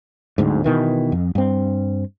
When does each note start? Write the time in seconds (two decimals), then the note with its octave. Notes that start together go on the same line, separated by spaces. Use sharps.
0.38 D1 G1 D2 G#2
0.64 B2 D#3 E3
1.12 F2
1.35 G2 C4